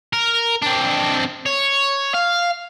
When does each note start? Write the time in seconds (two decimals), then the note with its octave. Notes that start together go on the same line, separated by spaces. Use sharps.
0.13 A#4
0.62 C4 D4
1.46 C#5
2.14 F5